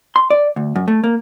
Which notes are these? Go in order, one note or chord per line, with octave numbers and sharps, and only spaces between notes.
C6
D5
D2
F#2
A3
A#3